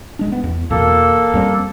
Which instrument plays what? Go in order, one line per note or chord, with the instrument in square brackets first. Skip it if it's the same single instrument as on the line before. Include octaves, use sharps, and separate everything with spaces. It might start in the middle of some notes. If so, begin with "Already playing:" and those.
[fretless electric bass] D1 G#3 D4
B3
E2
[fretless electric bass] E2 B2 [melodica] A#3 A4
[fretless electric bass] F2 G3 C4